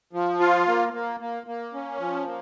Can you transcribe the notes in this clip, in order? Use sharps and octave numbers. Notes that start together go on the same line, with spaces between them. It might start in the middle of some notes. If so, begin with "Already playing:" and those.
F3
F4
A#3
A#3
A#3
A#3
C#4
F3
A#3